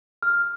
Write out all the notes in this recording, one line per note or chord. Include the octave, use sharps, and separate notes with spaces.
F6